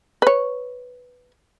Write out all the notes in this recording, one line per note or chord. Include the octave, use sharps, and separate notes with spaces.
B4 C#5